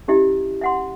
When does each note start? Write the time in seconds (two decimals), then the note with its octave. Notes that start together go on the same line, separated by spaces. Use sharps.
0.08 C#4 E4 G4 D#5 E5
0.61 E5 F#5 C6